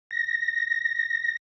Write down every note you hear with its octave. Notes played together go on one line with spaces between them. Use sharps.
A#6